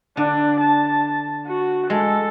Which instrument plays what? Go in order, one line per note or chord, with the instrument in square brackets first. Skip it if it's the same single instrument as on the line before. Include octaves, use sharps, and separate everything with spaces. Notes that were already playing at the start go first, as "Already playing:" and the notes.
[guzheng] D3 [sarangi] D4
[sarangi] A5
F#4
[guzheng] G#3 [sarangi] A4